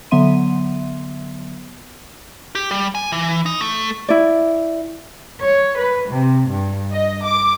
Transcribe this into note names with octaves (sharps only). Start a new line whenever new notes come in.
D3 F#3 B3 E5 C6 D#7
G4
G3
G#5
E3
D#4
A3
E4 D5
C#5
B4
C3
G2
D#5
D6